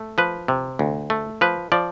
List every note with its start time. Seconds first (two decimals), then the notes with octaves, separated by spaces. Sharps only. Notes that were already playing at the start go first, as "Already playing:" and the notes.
Already playing: A3
0.18 F3 B4
0.48 C3
0.79 D2
1.10 A3
1.41 F3 B4
1.72 F3 D5